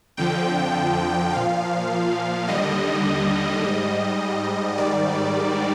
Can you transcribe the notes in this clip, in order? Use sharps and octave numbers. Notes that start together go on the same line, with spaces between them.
F2 D3 F3 G5
A#2 F3 F5
D#2 D3 G3 D#5
G#2 G3 D#5
G#2 D#3 G3 D5